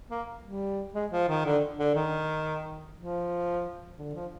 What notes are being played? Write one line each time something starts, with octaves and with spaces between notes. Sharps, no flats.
A#3
G3
G#3
F3
D#3
D3
D3
D#3
F3
D3
F3